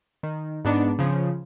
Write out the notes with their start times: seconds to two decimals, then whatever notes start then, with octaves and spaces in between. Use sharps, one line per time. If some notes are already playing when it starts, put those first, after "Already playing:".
0.23 D#3
0.65 G#2 B3 D4 D#4
0.99 C#3 F3